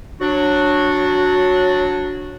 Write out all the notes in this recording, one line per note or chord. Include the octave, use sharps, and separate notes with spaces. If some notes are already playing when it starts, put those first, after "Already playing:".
F#3 D4 F#4